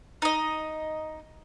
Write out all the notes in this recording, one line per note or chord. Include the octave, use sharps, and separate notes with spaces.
D#4 D#5